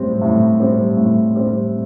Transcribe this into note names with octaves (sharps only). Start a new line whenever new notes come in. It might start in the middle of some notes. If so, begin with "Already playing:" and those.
Already playing: A2 G3 C4
A2
G3 C4
A2
G3 C4